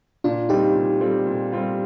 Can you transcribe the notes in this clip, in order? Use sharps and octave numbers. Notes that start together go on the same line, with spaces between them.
A#2 D4 F4
G3 C4 D#4 F4 G4
A#2
G3 C4 F4
A#2
G3 C4 F4